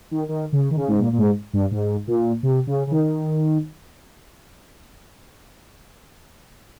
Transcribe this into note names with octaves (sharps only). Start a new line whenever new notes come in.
D#3
D#3
C#3
D#3
C#3
G#2
A#2
A#2
G#2
G2
G#2
A#2
C3
C#3
C#3
D#3